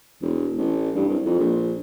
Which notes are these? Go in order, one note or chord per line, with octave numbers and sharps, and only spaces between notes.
E1
A1
G2
C2
F2
A#1